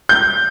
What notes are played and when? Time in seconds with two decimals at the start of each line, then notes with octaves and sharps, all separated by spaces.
0.09 G6